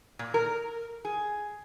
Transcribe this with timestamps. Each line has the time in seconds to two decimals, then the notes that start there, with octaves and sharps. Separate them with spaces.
0.19 A#2
0.34 A#4
1.05 G#4